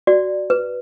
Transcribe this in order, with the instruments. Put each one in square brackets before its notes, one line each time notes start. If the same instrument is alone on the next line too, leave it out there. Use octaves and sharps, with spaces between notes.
[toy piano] F#4 D5
B4